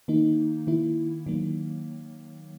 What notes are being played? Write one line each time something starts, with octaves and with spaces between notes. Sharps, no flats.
D#3 A#3 D#4
D#3 A#3 E4
D#3 F#3 A#3